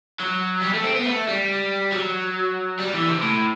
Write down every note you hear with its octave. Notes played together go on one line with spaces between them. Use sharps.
F#3
G3
A3
C4
B3
A3
G3
F#3
G3
E3
C3
A2